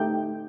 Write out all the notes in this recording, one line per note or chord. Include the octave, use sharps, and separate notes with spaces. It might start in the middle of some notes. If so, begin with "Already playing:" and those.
Already playing: A3 D#4 G4 G5